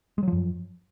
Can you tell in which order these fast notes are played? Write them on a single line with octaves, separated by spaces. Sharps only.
G#3 F#3 F3 F#2